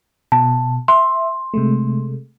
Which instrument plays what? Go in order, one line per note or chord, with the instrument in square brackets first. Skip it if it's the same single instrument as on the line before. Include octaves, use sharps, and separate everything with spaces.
[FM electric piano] B2 [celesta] A5
[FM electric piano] E5 [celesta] C6
[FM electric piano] C3 G#3 A3